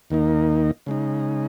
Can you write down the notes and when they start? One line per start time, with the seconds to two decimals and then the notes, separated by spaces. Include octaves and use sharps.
0.10 D#2 D#3 A#3 D#4
0.87 C#3 G#3 D#4